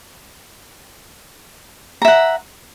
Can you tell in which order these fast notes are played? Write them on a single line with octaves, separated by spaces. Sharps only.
A#5 E5 F#5